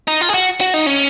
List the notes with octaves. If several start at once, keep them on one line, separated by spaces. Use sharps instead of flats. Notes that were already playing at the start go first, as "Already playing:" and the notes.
D#4
F4
G#4
F#4
F#4
D#4
C#4